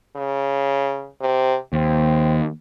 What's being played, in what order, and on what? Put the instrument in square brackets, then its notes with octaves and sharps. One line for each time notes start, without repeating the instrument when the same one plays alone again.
[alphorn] C#3
C3
[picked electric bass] D#2 [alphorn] C4